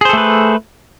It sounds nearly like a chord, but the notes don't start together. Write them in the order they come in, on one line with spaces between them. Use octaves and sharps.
G#4 C5 A4 A3 B4